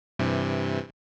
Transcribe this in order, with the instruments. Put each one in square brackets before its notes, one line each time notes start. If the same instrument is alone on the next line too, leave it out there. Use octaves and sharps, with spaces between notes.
[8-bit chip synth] G2 C3 E3